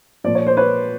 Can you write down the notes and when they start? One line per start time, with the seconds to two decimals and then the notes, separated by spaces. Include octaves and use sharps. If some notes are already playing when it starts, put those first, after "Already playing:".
0.24 A#2 F3 D5
0.35 C#5
0.47 C5
0.57 B4 C#5